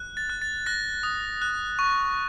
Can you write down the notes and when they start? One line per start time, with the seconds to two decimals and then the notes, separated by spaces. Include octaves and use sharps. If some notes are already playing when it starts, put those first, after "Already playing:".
Already playing: F#6
0.17 A6
0.30 F#6
0.42 A6
0.66 F#6 A#6
1.03 D#6
1.42 F#6
1.79 C#6